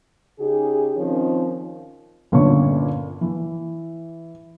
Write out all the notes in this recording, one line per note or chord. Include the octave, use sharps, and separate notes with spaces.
C#3 D#4 G4 G#4
D#3 F3 C4 C#4
G1 A#2 D3 C#4 C#5 C#6
E3